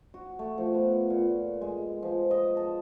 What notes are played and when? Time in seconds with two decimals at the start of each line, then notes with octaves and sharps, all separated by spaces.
0.14 F#4
0.39 A3
0.58 F3
0.75 B3
1.10 A#2
1.61 G#3
2.02 F3
2.31 D#5
2.57 A5